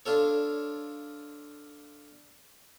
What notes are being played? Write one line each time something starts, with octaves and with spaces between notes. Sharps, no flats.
D4 F4 A4 C#5